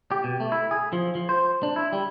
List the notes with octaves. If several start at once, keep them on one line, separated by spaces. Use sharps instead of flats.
G4
B2
A3
E4
G#4
F3
F3
C5
D4
E4
G3